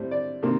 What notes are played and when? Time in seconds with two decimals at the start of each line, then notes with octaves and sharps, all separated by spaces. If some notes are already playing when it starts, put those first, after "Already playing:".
Already playing: A2 G3 C4
0.11 D5
0.43 C3 D#3 A#3